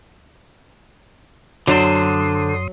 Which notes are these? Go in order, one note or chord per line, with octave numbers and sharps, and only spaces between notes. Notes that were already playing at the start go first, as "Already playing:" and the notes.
F#2 D3 F#3 D4 C5 C6 D#6